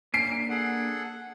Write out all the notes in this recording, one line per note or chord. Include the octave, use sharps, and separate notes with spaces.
A#3 D4 G#5 C7 D7
G#4 A4 F#5